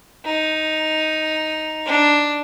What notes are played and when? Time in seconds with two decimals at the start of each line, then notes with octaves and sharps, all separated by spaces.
0.25 D#4
1.86 D4